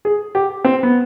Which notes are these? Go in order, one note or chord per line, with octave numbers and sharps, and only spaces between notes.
G#4
G4
C4
B3